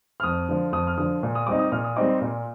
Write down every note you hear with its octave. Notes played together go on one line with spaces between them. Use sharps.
F6
F2 D#6
D3 F3
F2 D#6
F6
D3 F3 D#6
A#2
D#6
G3 C4 D#4 D6
D#6
A#2 F6
D#6
G3 C4 D#4 D6
C6
A#2